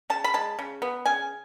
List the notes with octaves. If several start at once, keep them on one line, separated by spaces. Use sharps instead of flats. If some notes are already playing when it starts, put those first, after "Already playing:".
C#3 A5
B5
G#3 A5
C#3
B3
C#3 G#5